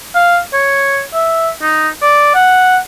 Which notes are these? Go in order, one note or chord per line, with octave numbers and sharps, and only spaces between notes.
F5
C#5
E5
D#4
D5
F#5